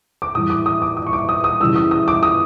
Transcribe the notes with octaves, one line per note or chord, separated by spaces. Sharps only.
D6
A2 E3 G3 D#6
D6
D#6
D6
D#6
C#6
D6
D#6
D#6
C#3 E3 G3 E6
D#6
D#6
D6
D#6